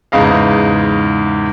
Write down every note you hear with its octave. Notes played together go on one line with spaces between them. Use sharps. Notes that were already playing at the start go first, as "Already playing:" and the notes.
E2 G#2 C#3 D#5 F5